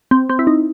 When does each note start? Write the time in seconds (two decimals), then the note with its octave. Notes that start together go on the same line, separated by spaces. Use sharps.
0.11 C4
0.30 C4
0.39 E4
0.47 D#4